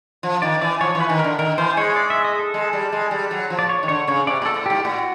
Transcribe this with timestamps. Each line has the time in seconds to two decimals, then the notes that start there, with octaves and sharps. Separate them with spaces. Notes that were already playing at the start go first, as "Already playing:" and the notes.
0.23 F3
0.42 D#3 D5
0.61 E3 D5
0.81 F3 C#5
0.95 E3
1.00 B4
1.09 D#3
1.19 A#4
1.24 D3
1.39 D#3 A#4
1.58 E3 C5
1.77 G#3 C#5
1.96 D5
2.10 E5
2.25 D#5
2.39 A4
2.54 G#3
2.73 G3
2.92 G#3
3.11 G3
3.31 F#3
3.50 F3
3.59 D5
3.69 C#5
3.83 D#3
3.88 D3 C#5
4.07 C#3 C#5
4.27 C3 D5
4.42 A#2 A4
4.56 A2
4.66 G#2 G4
4.84 A2 F#4